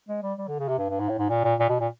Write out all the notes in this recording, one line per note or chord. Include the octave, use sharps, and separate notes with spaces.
G#3
G3
G3
D3
C#3
C3
G2
G2
G#2
A2
G#2
A#2
A#2
A#2
B2
A#2